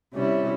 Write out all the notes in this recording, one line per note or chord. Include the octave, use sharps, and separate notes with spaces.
C3 G3 C#4 E4